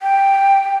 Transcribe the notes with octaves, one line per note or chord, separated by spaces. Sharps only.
G5